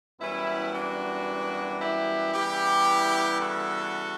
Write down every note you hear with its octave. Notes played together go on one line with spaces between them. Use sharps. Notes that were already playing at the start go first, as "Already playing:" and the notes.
F#2 E3 G3 B3 C#4 E4
D4 F#4
E4 G4
C#3 E3 G3 B3 E4 G4
F#4 A4